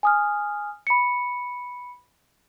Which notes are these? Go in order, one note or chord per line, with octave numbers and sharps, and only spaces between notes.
G#5 D#6 F6
B5 C#7